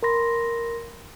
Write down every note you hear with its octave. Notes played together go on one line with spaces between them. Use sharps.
A#4 B5 C6 A#6